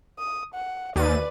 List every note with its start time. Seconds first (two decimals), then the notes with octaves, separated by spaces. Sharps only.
0.18 D#6
0.54 F#5
0.96 D#2 B4 D5 A6 D#7